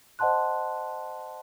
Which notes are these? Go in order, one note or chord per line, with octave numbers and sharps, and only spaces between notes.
C5 D#5 F#5 A5 C6 F#6